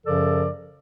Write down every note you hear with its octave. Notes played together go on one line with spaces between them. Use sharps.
F#2 C#3 F3 A4 A#4 D5